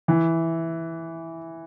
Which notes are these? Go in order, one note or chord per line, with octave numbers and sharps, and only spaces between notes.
E3